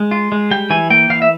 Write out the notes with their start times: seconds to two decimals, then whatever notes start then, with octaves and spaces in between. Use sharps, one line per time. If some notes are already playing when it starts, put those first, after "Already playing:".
Already playing: G#3
0.11 F4
0.32 G#3
0.51 G3 G5
0.70 E3 G#5
0.90 A#3 G5
1.09 E3 F5
1.22 E5